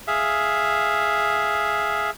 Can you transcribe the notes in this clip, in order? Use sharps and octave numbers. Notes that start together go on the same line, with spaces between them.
G#4 E5 F5